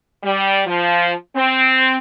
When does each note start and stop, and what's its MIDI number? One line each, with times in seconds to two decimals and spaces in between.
0.23 0.61 55
0.67 1.12 53
1.36 1.97 60